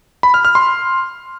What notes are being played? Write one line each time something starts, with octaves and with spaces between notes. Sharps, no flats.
B5
F6
F6
C6